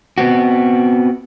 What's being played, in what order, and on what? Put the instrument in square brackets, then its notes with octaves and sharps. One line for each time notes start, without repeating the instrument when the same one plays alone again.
[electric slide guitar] B3 C4 F#4